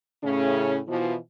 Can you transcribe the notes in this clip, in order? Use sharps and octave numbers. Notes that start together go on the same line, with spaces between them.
A2 C#3 C#4
B2 E3 F3